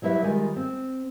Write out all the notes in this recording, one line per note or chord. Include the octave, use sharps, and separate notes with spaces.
F#3 G3 E4 B4 E5
D#3 G3 G#3 F4
C4